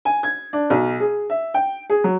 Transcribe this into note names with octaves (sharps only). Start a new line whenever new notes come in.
G#5
G#6
D4
B1
G#4
E5
G5
G#4
F#3